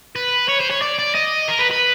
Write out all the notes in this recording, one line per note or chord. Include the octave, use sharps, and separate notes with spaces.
B4
C#5
C5
C#5
D5
D5
D#5
A#4
B4
B4